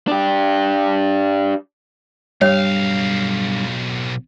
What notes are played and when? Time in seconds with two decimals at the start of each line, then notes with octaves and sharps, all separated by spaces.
0.08 D4 G4
2.42 B1 G2 C#5 F5